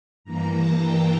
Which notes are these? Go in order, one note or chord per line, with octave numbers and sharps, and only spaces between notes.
G2 E3 A#3 A#5
A5
G5